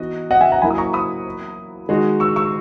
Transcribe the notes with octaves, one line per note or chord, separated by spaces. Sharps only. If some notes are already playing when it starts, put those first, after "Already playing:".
Already playing: E3 B3 D#4 F#4 D#5
D#5 F#5
E5 G#5
F#5 A#5
F#3 A#3 E4 G#5 B5
D#6
A#5 C#6
B5 D#6
D#3 G#3 D#4 F#4
C#6 E6
C#6 E6